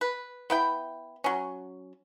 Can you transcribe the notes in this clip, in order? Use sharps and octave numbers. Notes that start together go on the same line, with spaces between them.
B4
B3 E4 G5
F#3 C#4